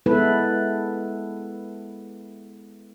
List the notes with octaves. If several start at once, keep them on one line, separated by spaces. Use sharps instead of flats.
G#3 B3 E4 A4 B4